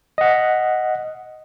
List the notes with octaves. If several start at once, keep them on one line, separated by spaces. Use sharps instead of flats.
D#5 F#5